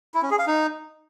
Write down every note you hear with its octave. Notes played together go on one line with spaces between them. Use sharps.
E4
C#4
G#4
F5
D#4